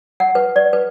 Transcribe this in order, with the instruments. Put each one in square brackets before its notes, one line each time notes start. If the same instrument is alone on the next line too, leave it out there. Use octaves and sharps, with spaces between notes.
[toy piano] F#5
B4
D5
B4